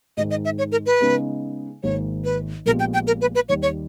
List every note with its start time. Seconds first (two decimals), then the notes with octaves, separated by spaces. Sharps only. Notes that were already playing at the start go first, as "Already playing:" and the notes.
0.17 G#2 D#3 G#3 D#5
0.31 D#5
0.45 E5
0.58 C#5
0.72 A#4
0.86 B4
1.01 C#3 G#3 B3 D#4
1.83 G#1 G#2 D#3 A#3 C#5
2.24 B4
2.66 A#1 A#2 G#3 B3 G4 A#4
2.80 G5
2.94 G5
3.07 A#4
3.21 B4
3.35 B4
3.49 D#2 D#3 G3 C#5
3.62 C#5